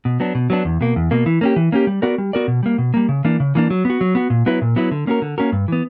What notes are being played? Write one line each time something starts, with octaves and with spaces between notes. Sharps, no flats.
B2
F#3 B3 D4
B2
F#3 B3 D4
E2
B2 A#3
E2
B2 A#3
E3
A#3 C#4 G4
E3
A#3 C#4 G4
G3
B3 F#4 A#4 D5
G3
B3 F#4 A#4 D5
B2
G3 A#3
B2
G3 A#3
C#3
E3 A#3 D4
C#3
E3 A#3 D4
F#3
B3 F#4
F#3
B3 F#4
A#2
F#3 B3 E4 B4
A#2
F#3 B3 E4 B4
D3
A#3 C#4 F#4 A#4
D3
A#3 C#4 F#4 A#4
G2
E3 B3